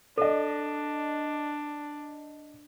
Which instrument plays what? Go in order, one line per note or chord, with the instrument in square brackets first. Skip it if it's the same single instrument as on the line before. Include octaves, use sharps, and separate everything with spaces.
[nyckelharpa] D4 [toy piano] A4 [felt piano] D5 D#5